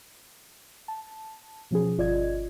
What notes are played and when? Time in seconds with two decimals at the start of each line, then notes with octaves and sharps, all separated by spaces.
0.88 A5
1.71 B2 F3 C#4 G#4
1.98 G1 F4 D5 D#5 G#6